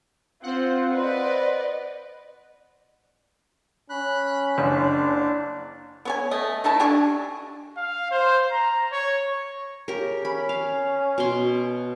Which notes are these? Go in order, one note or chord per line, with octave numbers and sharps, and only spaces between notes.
C4 F4 C5 F#5
B4 D5 D#5
C#4 B5 F#6
F#1 D4
B3 C#5 G#5
A3 D#5
A3 D#4 E4 A5
D4 G4 G#5 C#6
F5
C5
A#5
C#5
C#3 G4 A#4
C#4 B5
F5
B2 C6